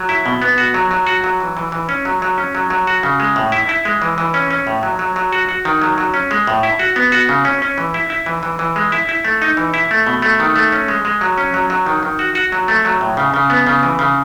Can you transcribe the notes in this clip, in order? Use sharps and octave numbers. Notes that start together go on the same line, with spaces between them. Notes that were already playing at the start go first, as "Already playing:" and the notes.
Already playing: F#3
E4
B2
B3
F#4
F#3
F#3
F#4
F#3
E3
E3
E3
C#4
F#3
F#3
C#4
F#3
F#3
F#4
C#3
G#3
A2
E4
E4
G#3
E3
E3
C#4
C#4
A2
F#3
F#3
F#3
F#4
F#4
D#3
F#3
F#3
C#4
G#3
A2
E4
F#4
B3
F#4
C#3
C#4
C#4
E3
E4
E4
E3
E3
E3
G#3
E4
E4
A3
D#4
E3
E4
A3
B2
A3
D#3
A3
C#4
G#3
G#3
F#3
C#4
F#3
F#3
D#3
D#3
F#4
F#4
F#3
A3
F#3
A2
C#3
C#3
B3
C#3
E3
C#3